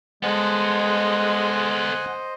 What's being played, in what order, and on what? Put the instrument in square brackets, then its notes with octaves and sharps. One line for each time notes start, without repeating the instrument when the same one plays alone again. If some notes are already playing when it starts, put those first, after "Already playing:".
[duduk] G#3 [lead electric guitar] B3 A4 [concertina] C5 D#5 [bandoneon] F#5 G#5